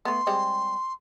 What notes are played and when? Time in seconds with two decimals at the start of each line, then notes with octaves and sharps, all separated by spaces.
0.05 A3 B3 C6
0.27 G3 G#3 C4